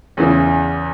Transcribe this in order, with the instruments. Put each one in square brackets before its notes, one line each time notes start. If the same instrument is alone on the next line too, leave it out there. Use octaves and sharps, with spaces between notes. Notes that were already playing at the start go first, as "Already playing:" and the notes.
[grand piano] E2 C#3 E3